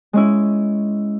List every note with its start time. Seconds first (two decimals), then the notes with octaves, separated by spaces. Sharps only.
0.13 G#3 C#4 E4